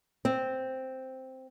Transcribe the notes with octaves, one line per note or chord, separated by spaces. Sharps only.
C4